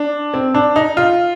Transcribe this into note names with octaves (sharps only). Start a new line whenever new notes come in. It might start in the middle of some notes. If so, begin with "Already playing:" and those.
Already playing: D4
C4
D4
D#4
F4